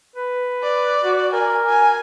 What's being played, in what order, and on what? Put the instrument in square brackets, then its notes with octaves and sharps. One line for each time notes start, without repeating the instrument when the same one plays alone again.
[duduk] B4
[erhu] D5
[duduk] F#4
[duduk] A#4 [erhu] G#5
[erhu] G#5